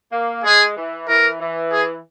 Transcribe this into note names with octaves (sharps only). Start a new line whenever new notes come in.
A#3
G#3 G#4
E3
E3 A#4
E3
G#4